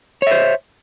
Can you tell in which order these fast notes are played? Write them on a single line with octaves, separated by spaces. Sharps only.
C#5 E5 C5